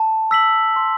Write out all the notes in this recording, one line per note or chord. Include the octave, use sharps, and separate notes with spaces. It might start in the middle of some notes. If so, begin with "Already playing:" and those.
Already playing: A5
E6 B6 F#7
C6